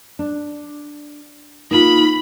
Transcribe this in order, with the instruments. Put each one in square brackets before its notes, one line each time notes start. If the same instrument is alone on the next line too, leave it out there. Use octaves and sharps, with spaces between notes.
[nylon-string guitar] D4
[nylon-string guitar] A#3 F4 [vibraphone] D#4 [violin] B5